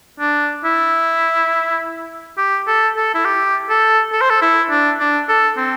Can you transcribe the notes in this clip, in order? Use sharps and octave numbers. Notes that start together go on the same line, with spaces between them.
D4
E4
G4
A4
A4
E4
G4
A4
A4
C5
A4
E4
D4
D4
A4
C4